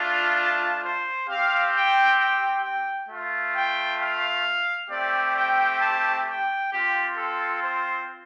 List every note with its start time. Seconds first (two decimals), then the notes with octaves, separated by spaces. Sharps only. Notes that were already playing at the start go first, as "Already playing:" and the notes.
Already playing: A3 D4 F4 F5
0.38 A5
0.83 C5
1.28 C4 G4 F5
1.73 G5
2.19 G5
2.63 G5
3.09 A3 F4
3.55 G5
4.00 F5
4.90 A3 C4 G4 D5
5.35 G5
5.81 A5
6.27 G5
6.71 C4 F4 G4
7.16 A4
7.62 C5